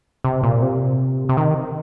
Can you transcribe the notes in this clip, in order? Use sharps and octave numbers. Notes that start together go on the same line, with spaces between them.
C3
A#2
C3
C3
D#3